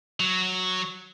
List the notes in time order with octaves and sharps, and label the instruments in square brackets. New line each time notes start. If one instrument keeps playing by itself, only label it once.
[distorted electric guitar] F#3